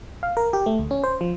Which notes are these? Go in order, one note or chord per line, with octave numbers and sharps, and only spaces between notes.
F5
A#4
G4
A3
D2
C#4
C5
F3